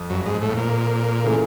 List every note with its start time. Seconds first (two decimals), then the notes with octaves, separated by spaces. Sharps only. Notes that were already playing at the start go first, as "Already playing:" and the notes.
Already playing: F2 F3
0.10 F#2
0.26 G#2
0.42 A2
0.57 A#2
1.24 C#3 E3 A3